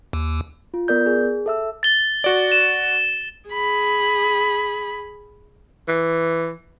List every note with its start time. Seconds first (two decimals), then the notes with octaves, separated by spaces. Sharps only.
0.13 D#2
0.74 F4
0.88 B3 A#4 D5 G6
1.06 G#4
1.46 A4 E5 E6
1.83 A6 G7
2.24 F#4 D5
2.52 E7
3.50 G#4 B5
5.88 E3